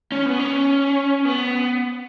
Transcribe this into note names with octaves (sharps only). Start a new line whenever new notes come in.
C#4
B3
C#4
B3